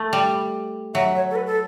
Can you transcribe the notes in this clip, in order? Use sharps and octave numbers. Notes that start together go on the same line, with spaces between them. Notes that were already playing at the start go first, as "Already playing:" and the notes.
Already playing: A3
G3
F#3 E5
C#5
A4
B4
A4